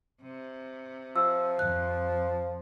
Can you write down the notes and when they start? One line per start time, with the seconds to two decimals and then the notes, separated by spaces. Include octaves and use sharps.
0.22 C3
1.16 F3 E6
1.59 F2 F#6